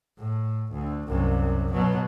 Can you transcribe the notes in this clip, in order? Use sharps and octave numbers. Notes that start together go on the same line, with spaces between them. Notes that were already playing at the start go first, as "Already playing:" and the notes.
A2
D2
C2 F#2
B2 F#3